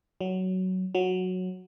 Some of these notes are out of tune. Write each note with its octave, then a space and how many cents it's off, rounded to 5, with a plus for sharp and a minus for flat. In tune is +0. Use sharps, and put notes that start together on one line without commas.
F#3 +10
F#3 -10